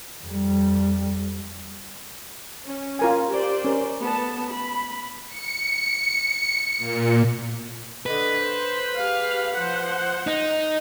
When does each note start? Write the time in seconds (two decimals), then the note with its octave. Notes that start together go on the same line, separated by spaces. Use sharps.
0.24 F2 G3
2.65 C#4
2.99 F4 A#4 G#5
3.30 G4 C5 D5
3.64 C#4 A#4
4.01 A3 B3 A5
4.48 B5
5.28 C#7
6.78 A#2
8.06 D3 B4 D#5
8.40 C5
8.97 G4 G#4 F5
9.55 F3 C5 F#5
10.27 D#4